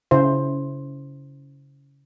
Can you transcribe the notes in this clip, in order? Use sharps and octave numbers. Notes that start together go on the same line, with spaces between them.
C#3 E4 C5